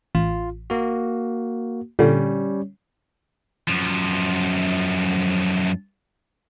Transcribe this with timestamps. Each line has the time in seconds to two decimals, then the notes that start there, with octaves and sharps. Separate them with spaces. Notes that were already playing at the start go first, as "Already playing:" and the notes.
0.15 A1 F4
0.70 A#3 F#4
1.99 A#2 D3 G3 C#4 C#5
3.68 F#2 F3